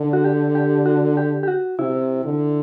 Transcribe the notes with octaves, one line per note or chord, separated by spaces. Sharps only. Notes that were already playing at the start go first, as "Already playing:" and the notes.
Already playing: D3
F#4
G4
G4
F#4
G4
G4
F#4
C3 E4
D3